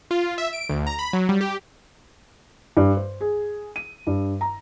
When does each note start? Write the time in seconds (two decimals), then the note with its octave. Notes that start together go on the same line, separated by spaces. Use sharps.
0.11 F4
0.38 E5
0.53 D7
0.69 D2
0.87 A#5
0.99 B5
1.13 F#3
1.29 G3
1.41 G4
2.77 G2
2.97 C5
3.21 G#4
3.76 D#7
4.07 G2
4.41 A#5